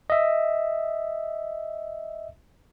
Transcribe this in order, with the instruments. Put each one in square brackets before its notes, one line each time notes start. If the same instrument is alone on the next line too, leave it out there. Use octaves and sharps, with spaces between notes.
[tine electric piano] D#5 E5